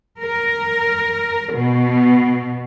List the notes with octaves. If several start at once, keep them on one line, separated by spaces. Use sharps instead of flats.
A#4
B2